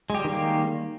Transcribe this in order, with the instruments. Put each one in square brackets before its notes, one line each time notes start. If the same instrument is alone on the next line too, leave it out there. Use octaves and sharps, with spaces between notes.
[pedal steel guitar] G#3
G4
G3
D#3
A#3